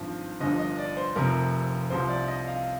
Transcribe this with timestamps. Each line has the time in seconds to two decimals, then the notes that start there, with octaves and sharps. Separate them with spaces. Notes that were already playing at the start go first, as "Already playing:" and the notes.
Already playing: G#1 G2 F3
0.40 G1 G2 F3 D#5
0.59 D#5
0.78 D5
0.97 C5
1.16 F1 F2 C3 F3 A#4
1.90 C2 C3 F3 C5
2.09 D5
2.28 D#5
2.47 F5